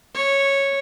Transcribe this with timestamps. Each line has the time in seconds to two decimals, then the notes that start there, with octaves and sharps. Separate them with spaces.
0.15 C#5